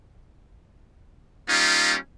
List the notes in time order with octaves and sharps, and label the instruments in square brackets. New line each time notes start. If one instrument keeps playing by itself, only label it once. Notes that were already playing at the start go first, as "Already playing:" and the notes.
[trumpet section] G3 A#3 C#4 D#4 F4